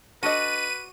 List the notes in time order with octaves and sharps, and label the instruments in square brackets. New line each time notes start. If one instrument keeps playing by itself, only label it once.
[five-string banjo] D4 A4 D#5 [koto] F#4 D5 [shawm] B4 [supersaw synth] D#7